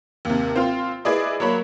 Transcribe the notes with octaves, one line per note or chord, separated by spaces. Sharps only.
D#2 C3
C4 F4 C6
E4 G#4 B4 D5 D#5
F#3 A#3 C#5 B5